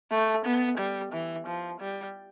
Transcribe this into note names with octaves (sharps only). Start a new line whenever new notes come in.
A3
B3
G3
E3
F3
G3